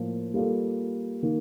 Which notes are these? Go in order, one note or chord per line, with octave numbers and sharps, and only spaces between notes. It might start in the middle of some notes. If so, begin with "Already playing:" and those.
Already playing: A2 F3 A#3
G3 A#3 F4 A4
D#3 A#3